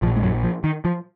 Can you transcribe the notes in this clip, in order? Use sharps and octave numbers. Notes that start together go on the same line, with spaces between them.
A#1 F3
A#2
G#3
F#2 F#3
F3
D#3
F3